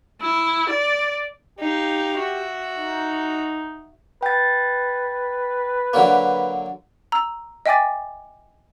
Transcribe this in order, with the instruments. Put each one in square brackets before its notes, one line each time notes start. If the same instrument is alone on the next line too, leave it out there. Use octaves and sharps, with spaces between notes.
[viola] E4
D5
[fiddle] D#4 F5 [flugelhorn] G4
[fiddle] F#4 E5
[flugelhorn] D#4
[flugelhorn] B4 [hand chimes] G5 A6
[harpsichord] D3 F#3 A#3
[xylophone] A#5 E6
D#5 E5 G5 G#5 D6 A6